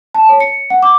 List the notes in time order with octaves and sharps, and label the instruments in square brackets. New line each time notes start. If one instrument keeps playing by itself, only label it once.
[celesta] A5
C#5
C#7
F#5
D6